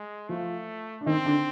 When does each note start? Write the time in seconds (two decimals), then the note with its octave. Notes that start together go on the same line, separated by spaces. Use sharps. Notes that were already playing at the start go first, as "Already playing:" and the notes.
Already playing: G#3
0.29 F3 A3 F4
1.01 D4
1.06 D#3 C4 D#4
1.25 D3 D4